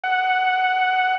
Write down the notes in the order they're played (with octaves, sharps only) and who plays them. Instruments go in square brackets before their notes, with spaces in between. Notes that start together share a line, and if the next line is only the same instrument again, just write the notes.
[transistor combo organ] F#5